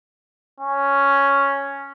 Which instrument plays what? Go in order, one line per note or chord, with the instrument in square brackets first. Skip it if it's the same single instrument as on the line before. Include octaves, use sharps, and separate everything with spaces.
[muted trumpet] C#4